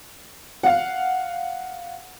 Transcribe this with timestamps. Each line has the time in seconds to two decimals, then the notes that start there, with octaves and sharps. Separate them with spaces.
0.63 F5 F#5